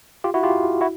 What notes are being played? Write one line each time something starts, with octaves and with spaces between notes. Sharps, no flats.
F4 G4
E4 F#4
F4 G4
E4 F#4